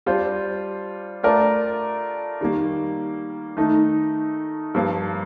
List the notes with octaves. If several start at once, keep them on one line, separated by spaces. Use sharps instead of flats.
G3 D4 F4 C5
A3 D4 F4 A#4 D5
D#3 G3 A#3
D#3 A3 D#4
G2 F3 A#3